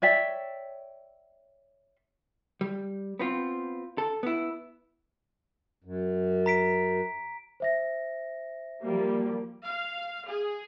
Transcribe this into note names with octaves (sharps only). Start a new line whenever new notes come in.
C#5 D5 E5 G5
G3
B3 C4 F4
A4
B3 E4
F#2
A#5 B6 D7
C5 E5 A#6
F3 G3 A#3
F5
G#4